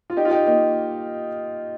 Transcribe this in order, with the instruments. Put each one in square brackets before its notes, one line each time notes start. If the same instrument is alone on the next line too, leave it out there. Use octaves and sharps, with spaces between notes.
[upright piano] F4
D#4 G4
F4
D#4 G4
A#3 D#4